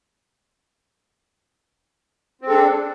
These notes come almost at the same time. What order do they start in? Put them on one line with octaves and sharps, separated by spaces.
C4 G#3 A4 D4